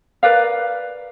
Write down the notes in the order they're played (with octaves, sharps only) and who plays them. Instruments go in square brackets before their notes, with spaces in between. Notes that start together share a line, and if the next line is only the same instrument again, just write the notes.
[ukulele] A#4 B4 D5 F5